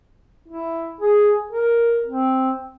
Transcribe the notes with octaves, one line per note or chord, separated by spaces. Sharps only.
E4
G#4
A#4
C4